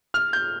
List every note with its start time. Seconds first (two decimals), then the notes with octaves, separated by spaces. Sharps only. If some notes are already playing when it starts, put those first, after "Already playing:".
0.14 F6
0.33 G6